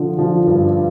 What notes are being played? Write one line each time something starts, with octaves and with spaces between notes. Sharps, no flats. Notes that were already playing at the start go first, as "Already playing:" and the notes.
Already playing: D3 F3
F3
G2